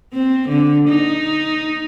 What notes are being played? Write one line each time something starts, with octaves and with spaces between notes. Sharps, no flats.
C4
D3
D#4